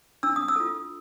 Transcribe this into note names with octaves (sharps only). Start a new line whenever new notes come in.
D4 E6
D#6
E6
F4 A4